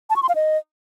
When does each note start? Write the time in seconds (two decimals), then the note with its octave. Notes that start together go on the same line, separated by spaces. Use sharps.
0.10 A5
0.16 C#6
0.23 C6
0.29 F5
0.35 D#5